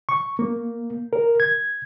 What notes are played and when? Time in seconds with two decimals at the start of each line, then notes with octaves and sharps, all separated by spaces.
0.09 C#6
0.39 A#3
1.13 A#4
1.40 G#6